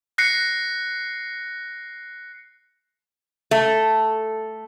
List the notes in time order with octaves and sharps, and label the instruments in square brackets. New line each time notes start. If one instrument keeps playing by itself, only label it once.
[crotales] F#6 A#6 C7 C#7
[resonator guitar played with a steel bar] A3